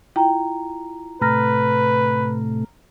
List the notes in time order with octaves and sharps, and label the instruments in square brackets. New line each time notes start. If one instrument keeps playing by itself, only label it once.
[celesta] E4 F4 A#5 [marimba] G5
[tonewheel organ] A2 C3 A3 [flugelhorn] B4 [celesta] A#5 F6 A#6